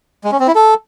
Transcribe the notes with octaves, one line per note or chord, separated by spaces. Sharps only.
G#3
C#4
C4
E4
A4